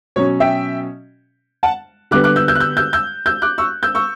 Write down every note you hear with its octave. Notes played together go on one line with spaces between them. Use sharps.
B2 F#3 C#4 C#5
E5 G5
F#5 A5
D3 G3 B3 D6 F#6
D6 F#6
E6 G6
E6 G6
F#6
E6 G6
E6 G6
E6 G6
E6 G6
D6 F#6
C#6 E6
E6 G6
C#6 E6